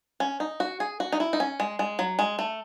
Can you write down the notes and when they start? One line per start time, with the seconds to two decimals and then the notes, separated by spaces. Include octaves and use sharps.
0.20 C#4
0.40 D#4
0.60 F#4
0.80 G#4
1.00 F#4
1.12 D#4
1.20 E4
1.33 D#4
1.40 C#4
1.60 G#3
1.79 G#3
1.99 F#3
2.19 G#3
2.39 A3